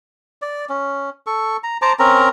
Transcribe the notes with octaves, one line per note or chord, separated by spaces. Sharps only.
D5
C#4
A4 C#6
A#5
C5 A5 A#5 D6
C4 C#4 A#4 A#5